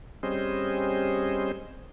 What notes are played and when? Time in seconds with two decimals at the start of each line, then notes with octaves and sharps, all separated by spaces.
0.23 G3 C4 C#4 G#4 C5 D#5